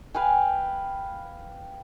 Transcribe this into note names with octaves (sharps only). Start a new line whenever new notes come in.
B4 F5 G5 G#5